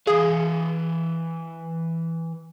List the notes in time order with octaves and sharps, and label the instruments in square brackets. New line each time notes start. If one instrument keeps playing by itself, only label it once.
[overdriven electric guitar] E3 F5 [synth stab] G#4